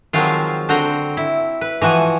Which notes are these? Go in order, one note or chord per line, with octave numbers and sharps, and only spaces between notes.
D#3 F3 F#3 G#3 C4 F4
D3 C4 F#4 G5 A#5
E4
B4
E3 F3 F#4 G#5